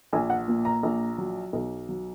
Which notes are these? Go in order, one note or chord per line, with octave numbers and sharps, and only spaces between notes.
A#1 G#5
F#5
A#2
A#5
A#1
F#3
B1
F#3